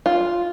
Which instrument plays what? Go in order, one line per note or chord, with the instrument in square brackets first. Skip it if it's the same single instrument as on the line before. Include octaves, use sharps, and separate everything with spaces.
[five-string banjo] F4